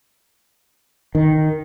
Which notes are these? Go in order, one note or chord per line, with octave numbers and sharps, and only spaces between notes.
D#3